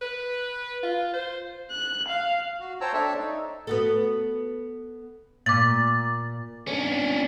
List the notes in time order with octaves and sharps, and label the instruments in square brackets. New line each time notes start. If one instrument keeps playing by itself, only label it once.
[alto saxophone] B4
F4
C5
[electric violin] F#6
F5
[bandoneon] F#4
C5 C#5 G5 A5 A#5 E6
D4 A4 C#5 D5 E5 A5
D#4
[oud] B3 F#4 A4
[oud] A#2 [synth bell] D6 A6
[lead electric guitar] C#4 D4